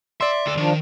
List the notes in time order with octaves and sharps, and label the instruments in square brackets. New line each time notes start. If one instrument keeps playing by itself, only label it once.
[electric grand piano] D5 C6 [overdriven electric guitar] E5
[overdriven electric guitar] D2 A4
[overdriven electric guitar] D#3 [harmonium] F3 D4